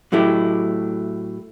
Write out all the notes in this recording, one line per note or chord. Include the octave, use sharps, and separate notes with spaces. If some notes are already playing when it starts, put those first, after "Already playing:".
A2 F#3 A3 E4 G4